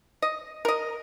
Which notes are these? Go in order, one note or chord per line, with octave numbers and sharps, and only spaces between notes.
D#5
A#4 D#5